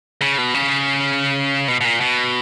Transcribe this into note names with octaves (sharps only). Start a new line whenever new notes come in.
C#3
B2
C#3
B2
B2
A#2
B2